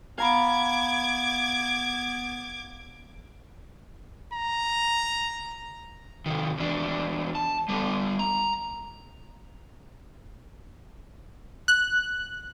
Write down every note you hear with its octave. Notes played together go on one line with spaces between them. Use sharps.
B3 F5 A#5 B5 D6 G#6
A#5
C3 D#3
E2 D4
A5
G3 B3
A#5
F#6